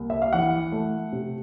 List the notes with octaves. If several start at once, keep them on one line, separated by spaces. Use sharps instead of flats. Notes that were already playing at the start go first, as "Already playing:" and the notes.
Already playing: C2 A#3
E5
F5
E3 F#5
A3
C3